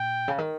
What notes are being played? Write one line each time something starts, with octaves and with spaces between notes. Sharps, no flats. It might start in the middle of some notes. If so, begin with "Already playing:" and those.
Already playing: A#2 G5
C#3
D#3